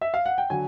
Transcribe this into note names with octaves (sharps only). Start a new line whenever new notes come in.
E5
F5
F#5
G5
D3 F#3 G#5